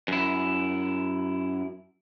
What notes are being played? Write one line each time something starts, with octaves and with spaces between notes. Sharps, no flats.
F#2 E4